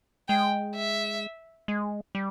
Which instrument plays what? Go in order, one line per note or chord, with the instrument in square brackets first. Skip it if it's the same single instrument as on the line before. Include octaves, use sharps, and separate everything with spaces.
[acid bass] G#3 [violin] G5
[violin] E5
[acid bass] G#3
G3